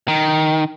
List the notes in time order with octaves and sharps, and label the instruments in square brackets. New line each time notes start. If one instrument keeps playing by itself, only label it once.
[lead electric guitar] D#3